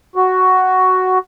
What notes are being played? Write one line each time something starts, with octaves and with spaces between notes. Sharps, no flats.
F#4